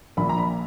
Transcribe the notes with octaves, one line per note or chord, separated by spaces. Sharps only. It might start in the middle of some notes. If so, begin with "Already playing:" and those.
A#1 A#2 F3 B5
A#5
B5